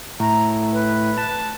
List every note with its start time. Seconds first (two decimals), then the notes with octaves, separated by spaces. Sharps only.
0.20 A2 A#5
0.73 B4
1.18 A5